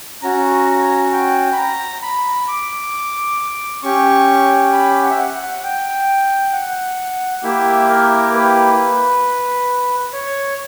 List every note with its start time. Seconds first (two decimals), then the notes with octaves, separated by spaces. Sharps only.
0.22 C#4 F#4 A#5
1.12 G5
1.52 B5
1.57 A#5
2.02 B5
2.48 D6
3.83 C#4 G4 C#6
4.73 B5
5.03 F#5
5.10 E5
5.19 F#5
5.33 F#5
5.63 G5
6.52 F#5
7.43 A#3 E4 G4 E5
7.89 A#4
8.34 B4
10.13 C#5